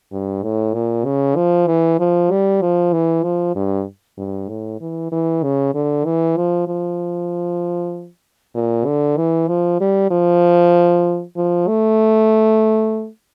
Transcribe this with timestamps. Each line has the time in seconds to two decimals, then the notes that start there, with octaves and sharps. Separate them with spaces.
0.12 G2
0.43 A2
0.74 A#2
1.05 C#3
1.36 F3
1.67 E3
2.00 F3
2.31 G3
2.62 F3
2.93 E3
3.24 F3
3.55 G2
4.18 G2
4.49 A2
4.81 E3
5.12 E3
5.43 C#3
5.75 D3
6.05 E3
6.37 F3
6.68 F3
8.55 A#2
8.86 D3
9.17 E3
9.48 F3
9.81 G3
10.11 F3
11.37 F3
11.68 A3